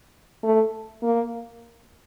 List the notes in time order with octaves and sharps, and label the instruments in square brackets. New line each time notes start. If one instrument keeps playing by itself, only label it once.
[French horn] A3
A#3